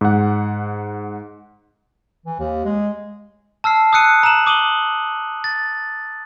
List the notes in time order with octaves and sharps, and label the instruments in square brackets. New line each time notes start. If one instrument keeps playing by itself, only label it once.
[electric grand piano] G#2 F#5
[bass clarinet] E3
D#2
G#3
[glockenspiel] A5 E6 F6 C7
D#6 E6 F#6 C#7 D#7
A#5 E6 D#7 E7 F#7
D6 D#6 D#7 F#7 G7
A6